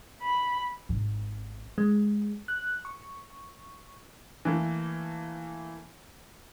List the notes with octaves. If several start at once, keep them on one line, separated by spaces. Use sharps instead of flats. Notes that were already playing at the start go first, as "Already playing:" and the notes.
B5
G#1
G#3
F#6
C#6
E3 A3 A#3